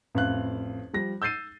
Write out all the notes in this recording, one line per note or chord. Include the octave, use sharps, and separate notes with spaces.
A1 F2 F5 F#6
F3 G3 A#6
E6 G6 A6 C7 D#7